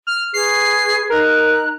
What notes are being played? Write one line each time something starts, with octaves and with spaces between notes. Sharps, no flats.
F6
G#4 B4 C#6 C7
D#4 A#4 A#5 F#6